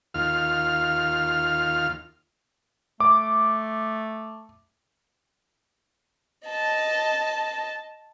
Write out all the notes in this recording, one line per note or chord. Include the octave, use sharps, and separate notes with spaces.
D#2 F4 F6
A3 D6
D#5 A5